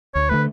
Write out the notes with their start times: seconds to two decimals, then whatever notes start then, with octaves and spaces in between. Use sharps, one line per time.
0.15 D2 C#5
0.29 D3 A3 B4